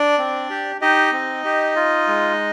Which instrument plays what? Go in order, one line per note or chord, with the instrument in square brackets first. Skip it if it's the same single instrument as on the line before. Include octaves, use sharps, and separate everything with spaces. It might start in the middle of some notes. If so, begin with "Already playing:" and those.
Already playing: [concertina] D4 D5
C4
G4
D#4 G4 D#5
C4
G4
F4
G#3